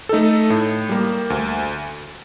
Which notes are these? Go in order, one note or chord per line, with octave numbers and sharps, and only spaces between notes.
A3 D#4 A4
A2
G3 A#3
D2